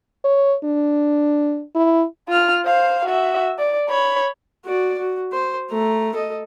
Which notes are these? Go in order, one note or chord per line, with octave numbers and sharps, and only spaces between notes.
C#5
D4
E4
F4 F6
C5 F5
F#4 E5
D5
C#5 B5
F#4 D5
F#4
C5
A3 A#5
A4 D#5